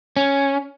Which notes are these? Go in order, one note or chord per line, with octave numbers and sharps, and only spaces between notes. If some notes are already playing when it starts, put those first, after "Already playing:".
C#4